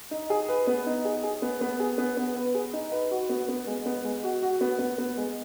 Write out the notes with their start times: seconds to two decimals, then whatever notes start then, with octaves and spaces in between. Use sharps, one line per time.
0.11 D#4
0.30 G#4
0.49 B4
0.67 B3
0.86 D#4
1.05 G#4
1.23 G#4
1.42 B3
1.61 B3
1.80 G#4
1.98 B3
2.17 B3
2.36 B4
2.55 G#4
2.73 D#4
2.92 B4
3.11 F#4
3.29 B3
3.49 B3
3.67 G#3
3.86 B3
4.05 G#3
4.24 F#4
4.42 F#4
4.61 B3
4.79 B3
4.98 B3
5.17 G#3